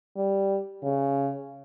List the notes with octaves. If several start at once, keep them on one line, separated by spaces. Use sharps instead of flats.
G3
C#3